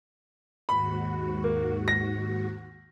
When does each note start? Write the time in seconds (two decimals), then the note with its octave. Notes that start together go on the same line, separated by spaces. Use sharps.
0.69 D#2 G#2 F#4 B5
1.44 A#3
1.88 A#6